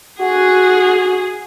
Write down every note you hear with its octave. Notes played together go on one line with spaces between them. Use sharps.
F#4 G#4 F#5